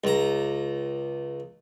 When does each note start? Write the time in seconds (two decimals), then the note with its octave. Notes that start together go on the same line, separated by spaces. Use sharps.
0.04 C#2 A#5